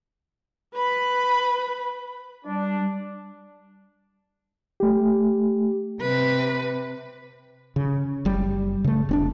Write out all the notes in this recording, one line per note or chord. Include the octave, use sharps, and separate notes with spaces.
B4 B5
G3 D4
A3 G4
C3 B4
C#3
F#1 G3
C#3 A3
F1 C4 D4